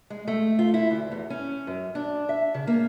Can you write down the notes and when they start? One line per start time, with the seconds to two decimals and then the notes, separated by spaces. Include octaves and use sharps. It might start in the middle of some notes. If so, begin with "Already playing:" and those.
0.10 G#3
0.27 A3
0.59 F4
0.74 E4
0.90 D2
1.12 E2
1.30 C#4
1.67 F#2
1.95 D4
2.29 E5
2.54 C#3
2.67 A#3